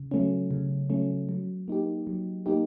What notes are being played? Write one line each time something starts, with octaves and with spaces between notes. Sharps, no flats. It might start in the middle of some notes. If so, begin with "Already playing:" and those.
Already playing: C#3
F#3 A3 C#4
C#3
F#3 A3 C#4
F#3
A#3 D#4 G4
F#3
A#3 D#4 G4